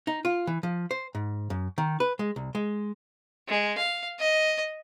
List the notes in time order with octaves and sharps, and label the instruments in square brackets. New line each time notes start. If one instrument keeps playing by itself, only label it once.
[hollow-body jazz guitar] D#4
F4
E3
F3
C5
G#2
F#2
D#3
B4
G#3
C2
G#3
[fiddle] G#3
F5
D#5